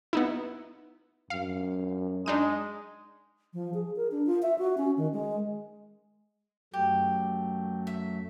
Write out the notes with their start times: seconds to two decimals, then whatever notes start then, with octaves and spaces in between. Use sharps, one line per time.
0.13 B3 D#4 E4
1.30 F#2 F5
2.26 G#3 D4 D#4 D#7
3.54 F3
3.74 G#4
3.96 A#4
4.11 D4
4.27 F4
4.43 E5
4.58 F#4
4.78 C#4
4.97 D#3
5.13 G#3
6.74 F#2 F#3 A3 G4
7.87 E5